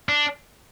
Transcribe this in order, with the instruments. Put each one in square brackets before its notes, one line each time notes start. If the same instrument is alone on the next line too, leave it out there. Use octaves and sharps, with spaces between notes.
[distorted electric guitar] D4